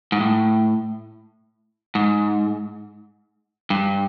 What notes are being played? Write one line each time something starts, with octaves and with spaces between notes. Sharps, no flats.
G#2
A2
G#2
G2